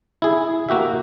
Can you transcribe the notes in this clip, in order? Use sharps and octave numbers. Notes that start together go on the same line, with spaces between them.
E4 G#4
A#3 F#4 G4 E5